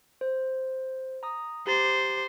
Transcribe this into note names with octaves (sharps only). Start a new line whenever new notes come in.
C5
A#5 D#6
G4 C5 A#5 A6